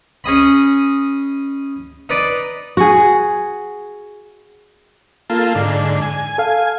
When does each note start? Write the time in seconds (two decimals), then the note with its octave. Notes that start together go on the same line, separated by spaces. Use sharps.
0.24 C#4 G#4 D#5 B5
2.09 D#4 B4 D5
2.77 F#4 G#4
5.30 A#3 F4 A4
5.55 G#2 D3
6.02 G#5
6.38 A4 F5